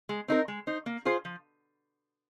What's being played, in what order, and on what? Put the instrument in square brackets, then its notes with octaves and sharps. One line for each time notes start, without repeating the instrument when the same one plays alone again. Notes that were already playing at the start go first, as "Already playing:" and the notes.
[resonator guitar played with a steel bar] G#3
C4 D#4 A#4
G#3
D#4 C5
A#3
F4 G#4 C5
F3